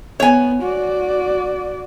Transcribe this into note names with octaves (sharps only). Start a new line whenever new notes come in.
B3 C#5 G#5
F#4 D5